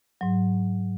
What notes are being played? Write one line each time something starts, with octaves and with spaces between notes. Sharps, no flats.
G#2 F#3